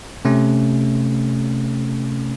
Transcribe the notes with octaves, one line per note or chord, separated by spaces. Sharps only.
C3 A3 C#4